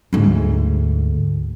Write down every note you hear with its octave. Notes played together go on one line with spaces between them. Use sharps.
D2 G#2